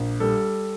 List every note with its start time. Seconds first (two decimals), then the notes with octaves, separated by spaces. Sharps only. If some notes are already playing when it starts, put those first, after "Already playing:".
Already playing: A#1
0.20 G3 A4